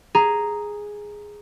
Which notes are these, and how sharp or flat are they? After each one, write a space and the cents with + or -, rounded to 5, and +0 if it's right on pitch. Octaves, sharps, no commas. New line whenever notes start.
G#4 +0 A#5 +0